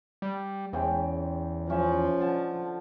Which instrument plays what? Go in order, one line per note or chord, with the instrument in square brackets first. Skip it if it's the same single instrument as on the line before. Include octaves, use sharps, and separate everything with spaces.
[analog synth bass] G3
[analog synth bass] E2 [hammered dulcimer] G#2 C#4 G5
[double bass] F3 [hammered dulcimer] C#4 E5
[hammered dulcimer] D3 A5